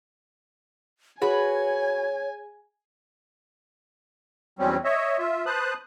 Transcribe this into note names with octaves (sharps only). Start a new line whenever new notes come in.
F#4 G#4 B4 C#5 G#5
E2 F#3 G3 C4 C#4
C#5 D#5 E5
F4 E5
B4 C5 A5 D#6 F#6